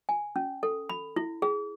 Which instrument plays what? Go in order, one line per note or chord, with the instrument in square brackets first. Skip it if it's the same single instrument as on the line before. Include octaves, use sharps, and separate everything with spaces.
[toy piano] G#5
C#4
A4
B5
E4
G#4